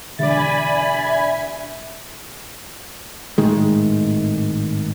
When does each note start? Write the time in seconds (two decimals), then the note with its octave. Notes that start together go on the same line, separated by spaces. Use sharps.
0.19 E1 D3 G4 D5 E5 G#5 B5 A6
3.38 G#1 A2 D#3 G#3